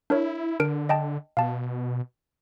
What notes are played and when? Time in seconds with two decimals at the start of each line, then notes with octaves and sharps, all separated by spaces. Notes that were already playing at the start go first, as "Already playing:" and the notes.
0.10 D4 E4 A#4 C#5
0.60 D3 D4 A#4 D7
0.89 D#5 G5 A5
1.37 B2 F5 A5